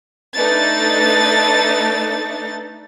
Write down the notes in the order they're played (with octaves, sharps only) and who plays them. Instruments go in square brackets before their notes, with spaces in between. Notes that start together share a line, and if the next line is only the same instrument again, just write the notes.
[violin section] A3 D4 D#4 B4 A6